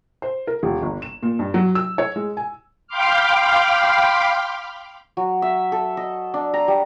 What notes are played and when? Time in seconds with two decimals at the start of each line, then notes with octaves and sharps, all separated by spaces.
0.22 C5
0.47 A#4
0.63 D#1
0.82 G1
1.02 E7
1.23 A#2
1.39 G2
1.54 F#3
1.75 E6
1.98 C#5
2.16 G#3
2.37 G#5
2.87 F5 G5 B5 C6 D6 F6
5.17 F#3
5.42 E5
5.72 A4
5.97 D#5
6.34 D4
6.54 A#5
6.68 G3